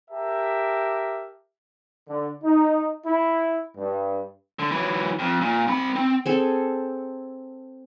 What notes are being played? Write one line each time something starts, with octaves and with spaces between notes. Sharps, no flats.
G4 A#4 E5 A5
D3
D#4
E4
G2
D3
E3 F#3
F2
A#2
C4 B5
C4
C4 G#4 A4